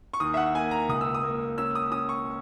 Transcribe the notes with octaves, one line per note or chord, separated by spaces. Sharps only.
C#6
D#2 D#6
E5
F#5
A#3 G#5
A#5
C#2 D#6
E6
D#6
A#3
C#4 E6
D#6
C#4 D#6
C#6